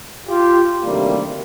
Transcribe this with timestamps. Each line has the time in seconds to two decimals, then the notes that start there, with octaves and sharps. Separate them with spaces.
0.28 F4 G4
0.82 D2 C3 D#3 G3 A#3